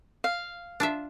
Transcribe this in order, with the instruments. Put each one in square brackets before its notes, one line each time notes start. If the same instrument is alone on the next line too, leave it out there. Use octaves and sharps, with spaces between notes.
[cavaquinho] F5
[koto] D4 F4 E5